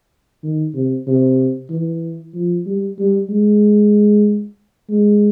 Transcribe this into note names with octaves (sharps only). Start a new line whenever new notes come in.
D#3
C3
C3
E3
F3
G3
G3
G#3
G#3